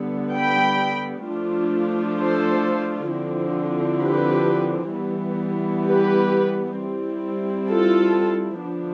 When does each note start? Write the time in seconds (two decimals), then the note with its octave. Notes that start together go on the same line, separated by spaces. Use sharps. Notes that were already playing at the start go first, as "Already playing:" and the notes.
Already playing: D3 G3 B3
0.36 G5 B5
1.28 F3 A3 D4 F4
2.19 A4 C5
3.11 D3 F3 C4 E4
4.03 G4 B4
4.94 E3 G3 B3
5.87 G4 B4
6.79 G3 C4 E4
7.69 F4 A4
8.62 D3 F3 B3 D4